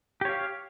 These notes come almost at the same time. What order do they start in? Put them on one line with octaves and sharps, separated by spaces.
G4 C#5 F5